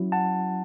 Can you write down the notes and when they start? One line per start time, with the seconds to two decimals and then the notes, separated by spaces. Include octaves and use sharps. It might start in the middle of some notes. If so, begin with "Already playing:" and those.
Already playing: F#3 C#4 E4
0.12 F#5 A5